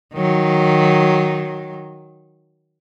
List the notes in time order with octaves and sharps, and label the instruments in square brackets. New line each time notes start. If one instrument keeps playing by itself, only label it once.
[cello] D#3 F#3